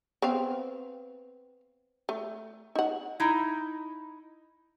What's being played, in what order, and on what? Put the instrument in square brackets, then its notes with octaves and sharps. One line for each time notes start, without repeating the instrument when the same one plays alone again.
[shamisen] B3 C4 F5
A3
D#4 F#5
[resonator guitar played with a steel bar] D#4 E4